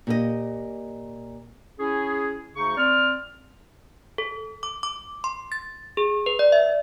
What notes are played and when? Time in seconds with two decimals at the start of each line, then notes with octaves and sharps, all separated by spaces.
0.07 A#2 G4 D#5
1.80 C#4 E4 G#4
2.56 D2 C#3 D#4 C#6
2.78 C4 D5 F6
4.18 A4
4.63 D6
4.83 D6
5.24 C6
5.52 A6
5.97 G#4
6.26 B4
6.39 D5
6.52 E5